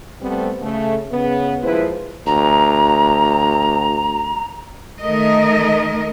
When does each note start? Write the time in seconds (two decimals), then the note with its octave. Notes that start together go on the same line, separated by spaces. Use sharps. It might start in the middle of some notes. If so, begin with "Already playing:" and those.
0.22 G3 A3 B3 C4
0.61 C#3 A3
1.12 C#3 B3
1.62 D#2 F3 G#3 E4 B4 C5
2.27 D2 A#5
5.01 D#3 A3 A#4 D#5